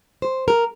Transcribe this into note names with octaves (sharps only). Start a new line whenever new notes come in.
C5
A#4